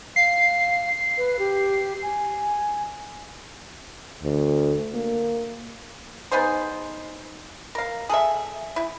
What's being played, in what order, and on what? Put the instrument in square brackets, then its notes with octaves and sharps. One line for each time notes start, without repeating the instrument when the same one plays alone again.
[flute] F5 [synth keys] C7
[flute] B4
G4
G#5
[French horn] D2
A#3
[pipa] B3 D#4 G#4 C5
A#4 F5
G#4 A4 E5
E4